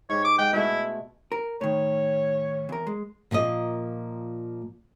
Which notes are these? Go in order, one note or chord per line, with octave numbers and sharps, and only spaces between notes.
G#2 G4 C#5
D6
G#3 F#5 G5
B2 G#3 A3 E4
A#4
A2 D#3 C#5
E2 A#4
G#3
A#2 F3 A#3 D#5